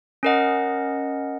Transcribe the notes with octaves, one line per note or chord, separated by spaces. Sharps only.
C#4 A#4 D#5 F#5